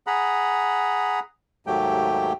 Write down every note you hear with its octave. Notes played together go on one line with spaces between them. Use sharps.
G#4 F#5 A#5 B5
D#2 G#2 F#3 A3 G4 G5